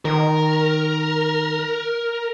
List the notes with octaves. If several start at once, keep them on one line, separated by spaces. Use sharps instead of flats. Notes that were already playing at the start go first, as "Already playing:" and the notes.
D#3 A#4